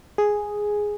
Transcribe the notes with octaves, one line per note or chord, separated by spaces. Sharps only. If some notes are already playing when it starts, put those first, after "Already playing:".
G#4